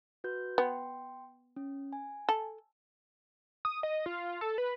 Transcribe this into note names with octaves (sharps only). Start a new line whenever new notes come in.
F#4 B4 G6
B3 G5 C6
C#4
G#5
A4
D#6
D#5
F4
A4
B4